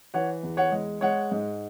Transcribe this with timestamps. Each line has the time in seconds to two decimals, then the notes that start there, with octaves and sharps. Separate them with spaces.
0.14 E3 C#5 F#5
0.43 E2
0.57 C#5 F#5
0.72 G#3
1.01 G#3 C#5 F#5
1.31 G#2